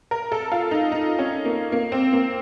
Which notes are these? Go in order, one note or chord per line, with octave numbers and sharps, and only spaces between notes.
A#4
A4
F4
D#4
D#4
C#4
A#3
A#3
C4
A#3